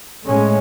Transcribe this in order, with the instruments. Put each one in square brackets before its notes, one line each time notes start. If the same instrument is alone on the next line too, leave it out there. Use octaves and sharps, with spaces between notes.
[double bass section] A2 G#3 C#4